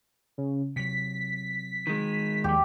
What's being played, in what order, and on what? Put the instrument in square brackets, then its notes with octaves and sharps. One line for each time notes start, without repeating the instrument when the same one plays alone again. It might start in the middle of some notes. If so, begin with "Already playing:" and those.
[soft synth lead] C#3
[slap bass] C3 F#3 [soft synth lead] B6
[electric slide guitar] D#3 G#3
[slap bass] D#2 F3 [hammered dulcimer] G4